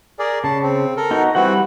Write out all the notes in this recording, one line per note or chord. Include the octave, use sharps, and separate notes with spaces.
G#4 A#4 D5
C#3 A5
C4
A4 A#4
B3 D#4 F#4
E3 G3 C4 E4 F#4 F#5